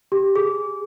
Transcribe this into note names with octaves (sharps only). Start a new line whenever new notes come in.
G4
G#4